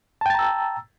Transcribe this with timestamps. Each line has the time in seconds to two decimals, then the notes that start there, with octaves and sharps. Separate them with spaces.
0.21 A5
0.26 G5
0.30 A6
0.34 A#5
0.39 E6